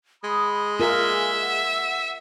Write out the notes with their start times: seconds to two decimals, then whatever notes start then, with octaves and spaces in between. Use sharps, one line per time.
0.24 G#3 B5 D#6
0.80 F4 G#4 A#4 E5 G#5
1.40 F#5